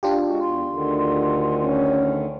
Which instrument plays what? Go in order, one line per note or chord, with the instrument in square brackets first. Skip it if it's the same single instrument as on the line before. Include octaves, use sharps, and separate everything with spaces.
[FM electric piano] D4 F4 G4
[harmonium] G#3 F#4
[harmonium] E2 [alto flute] C6
[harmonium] D2 D3 D#3
[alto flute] C#4